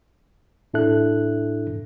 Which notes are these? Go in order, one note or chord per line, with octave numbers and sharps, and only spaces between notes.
A2 D4 E4 A4 E5 F#6